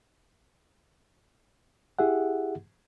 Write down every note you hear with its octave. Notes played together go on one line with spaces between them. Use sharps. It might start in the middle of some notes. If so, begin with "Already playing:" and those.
E4 G4 G#4 E5 F#5